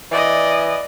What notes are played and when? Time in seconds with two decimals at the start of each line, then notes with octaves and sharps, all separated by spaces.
0.11 E3 D5 D#5